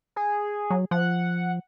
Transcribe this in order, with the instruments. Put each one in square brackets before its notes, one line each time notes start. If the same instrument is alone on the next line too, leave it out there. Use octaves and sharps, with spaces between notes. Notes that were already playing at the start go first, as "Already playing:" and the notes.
[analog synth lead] G#4
[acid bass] F#3
[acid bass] F3 [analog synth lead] F#5